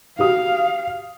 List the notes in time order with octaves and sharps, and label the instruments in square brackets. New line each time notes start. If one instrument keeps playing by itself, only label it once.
[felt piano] F#4 G4 D#6 [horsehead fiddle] F5